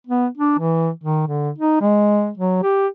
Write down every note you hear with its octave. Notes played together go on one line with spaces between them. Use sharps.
B3
D4
E3
D#3
D3
D#4
G#3
F#3
G4